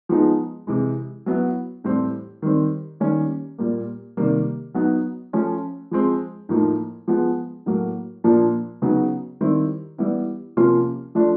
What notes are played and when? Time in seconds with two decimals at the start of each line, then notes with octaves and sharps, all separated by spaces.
0.09 F3 G#3 B3 D#4
0.67 C3 E3 G#3
1.26 F#3 B3 E4
1.84 A2 E3 G3 C4
2.42 D#3 G3 C4
3.00 D#3 G3 A#3 C#4
3.58 A#2 G3 A#3
4.17 C3 D#3 G3 A#3
4.74 F#3 B3 D#4
5.33 F3 A3 C#4 F4
5.91 F3 G#3 C4
6.49 A2 F3 A#3 D#4
7.08 F3 G#3 B3
7.66 A2 F#3 A#3
8.24 A#2 F3 A#3 D4
8.82 C#3 F#3 B3 D#4
9.41 D#3 G3 C4 E4
9.98 E3 G3 B3 E4
10.57 C3 F3 A#3 C#4 F4
11.15 F3 A3 D4 F4